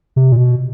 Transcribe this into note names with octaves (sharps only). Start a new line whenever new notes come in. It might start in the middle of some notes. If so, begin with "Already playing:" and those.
C3
A#2
B2